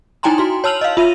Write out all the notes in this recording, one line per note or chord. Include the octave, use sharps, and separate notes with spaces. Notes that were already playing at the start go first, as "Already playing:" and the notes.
D#4 E4 G5 G#5 A#5 C6
F#4 C6
C#5 A5 E6 F6 F7 F#7
D#5 F5
F4 E5 D#7 F7